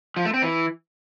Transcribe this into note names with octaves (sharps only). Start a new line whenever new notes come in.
F3
A3
C4
E3